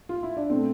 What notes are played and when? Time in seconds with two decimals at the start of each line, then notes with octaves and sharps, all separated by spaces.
0.09 F4
0.23 E4
0.37 D4
0.50 B2 A3 C4